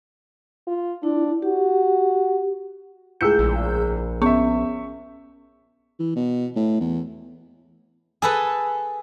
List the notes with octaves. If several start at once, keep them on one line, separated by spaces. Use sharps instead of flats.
F4
D4 E4
F#4 G4
C#2 A2 G#4 E6 G6 C#7
A#1
B3 C#4 E5 C#6
E3
B2
A2
E2
G#4 A4 B4